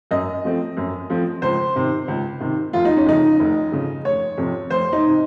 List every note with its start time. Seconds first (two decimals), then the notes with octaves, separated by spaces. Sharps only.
0.11 F#2 D#5
0.44 F3 A3 C4
0.77 F#2
1.10 F3 A3 C4
1.42 C#2 C5
1.75 C3 D#3
2.08 C#2
2.40 C3 D#3
2.73 F1 F4
2.85 D#4
2.97 C#4
3.06 F2 C#3 D#4
3.39 F1
3.72 F2 C#3
4.05 F1 C#5
4.38 F2 C3
4.70 F1 C5
4.93 D#4
5.06 C3